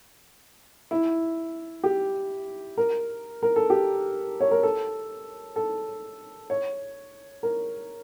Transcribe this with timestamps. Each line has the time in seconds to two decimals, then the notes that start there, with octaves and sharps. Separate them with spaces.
0.91 E4
1.84 G4
2.77 A#4
3.43 A#4
3.56 A4
3.70 G4
4.40 C#5
4.51 A#4
4.63 A4
5.56 A4
6.50 C#5
7.43 A#4